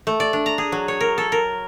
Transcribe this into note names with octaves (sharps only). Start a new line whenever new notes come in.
A3
D5
D4
A#5
G#4
F#3
C#5
A#4
A4
A#4